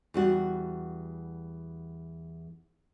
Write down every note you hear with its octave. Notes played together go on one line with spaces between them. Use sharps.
E2 G3 F#4